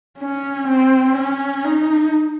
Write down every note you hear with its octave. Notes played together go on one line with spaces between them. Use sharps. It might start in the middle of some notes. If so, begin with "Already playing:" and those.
C#4
C4
C#4
D#4